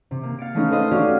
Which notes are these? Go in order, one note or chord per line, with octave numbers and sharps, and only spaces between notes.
C3
A#3
F5 A6 C#7 D7
G#3 A3 B3 C#4 D#4
A4 B4 C5 D#5 F5
C#4 D4 F#4 G4 D5 F5